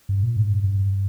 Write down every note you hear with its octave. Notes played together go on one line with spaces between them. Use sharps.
G2
A#2
G#2
G2
G2